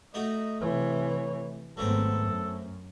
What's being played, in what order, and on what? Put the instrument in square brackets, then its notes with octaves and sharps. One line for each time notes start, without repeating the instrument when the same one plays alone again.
[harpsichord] A3 D#4 F#4 [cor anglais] D#5
[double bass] C3 E3 [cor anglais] C#5
[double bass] G#1 B3 [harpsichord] F#3 A3 C4 [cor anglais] A4
[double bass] F#2